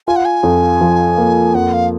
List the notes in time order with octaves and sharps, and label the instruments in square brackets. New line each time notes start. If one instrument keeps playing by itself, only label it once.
[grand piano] F4 [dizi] G#5
[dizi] F#5
G#5
[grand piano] F2
F3
A#3
[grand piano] F2 [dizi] F#5
[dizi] F5